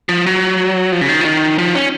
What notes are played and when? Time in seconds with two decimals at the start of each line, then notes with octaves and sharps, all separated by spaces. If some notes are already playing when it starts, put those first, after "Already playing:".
0.09 F3
0.26 F#3
0.92 F3
1.01 C#3
1.08 D#3
1.21 F3
1.25 D#3
1.59 F3
1.75 C#4